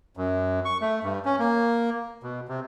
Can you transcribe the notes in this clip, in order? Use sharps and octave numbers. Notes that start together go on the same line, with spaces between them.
F#2
C#6
A3
G2
C#4
A#3
B2
C3